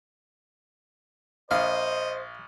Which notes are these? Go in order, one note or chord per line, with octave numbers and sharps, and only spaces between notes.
A#1 C5 D#5 F5